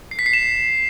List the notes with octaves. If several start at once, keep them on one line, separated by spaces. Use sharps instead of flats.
C7
B6
C7
E7